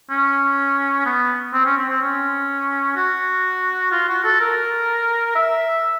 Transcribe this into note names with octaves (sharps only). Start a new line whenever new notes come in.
C#4
B3
C4
C#4
C4
C4
C#4
F#4
F4
F#4
A4
A#4
E5